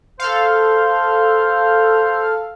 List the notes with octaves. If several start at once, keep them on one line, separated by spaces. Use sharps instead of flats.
A4 C5 F5